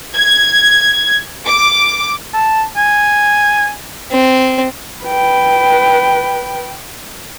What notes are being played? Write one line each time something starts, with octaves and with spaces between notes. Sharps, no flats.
G#6
D6
A5
G#5
C4
B4 G5